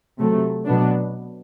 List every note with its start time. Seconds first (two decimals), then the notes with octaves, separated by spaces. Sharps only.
0.18 C3 F#3 A3
0.66 B2 F#3 B3 D4